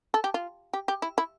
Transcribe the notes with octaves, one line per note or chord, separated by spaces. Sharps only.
A4
G4
F4
G4
G4
E4
E4